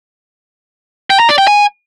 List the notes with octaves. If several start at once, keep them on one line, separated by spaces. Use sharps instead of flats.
G5
A#5
D5
G5
G#5